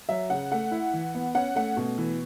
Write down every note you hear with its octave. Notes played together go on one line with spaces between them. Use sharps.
F#3 E5
C#3 F#5
A3 F#5
E4
E3
B3
C#4 F#5
A3 F#5
B2
E3